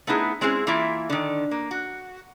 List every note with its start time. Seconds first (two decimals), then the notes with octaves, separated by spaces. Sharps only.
0.07 A3 B3 D#4 E4 G#4
0.41 G#3 C4 C#4 E4 G#4
0.67 E3 A#3 E4 F4 E5
1.10 D3 D#3
1.51 A#3
1.71 F#4